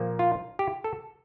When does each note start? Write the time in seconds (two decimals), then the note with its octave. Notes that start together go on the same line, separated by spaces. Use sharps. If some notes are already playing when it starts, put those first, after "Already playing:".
Already playing: A#2 F3 A#3
0.19 F4
0.59 G4
0.84 A4